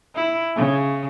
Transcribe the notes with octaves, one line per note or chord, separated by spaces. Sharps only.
E4
C#3